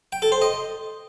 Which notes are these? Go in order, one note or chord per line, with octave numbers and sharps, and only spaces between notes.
G5
A4
C5
D#5